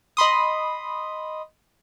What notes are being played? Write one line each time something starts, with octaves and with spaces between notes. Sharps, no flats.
D#5 B5 C6 D#6